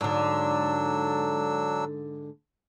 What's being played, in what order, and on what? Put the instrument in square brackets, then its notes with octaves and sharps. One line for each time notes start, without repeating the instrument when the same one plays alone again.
[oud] G#2 D3 [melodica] F#3 D4 E6